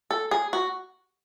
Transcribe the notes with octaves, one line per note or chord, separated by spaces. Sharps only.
A4
G#4
F#4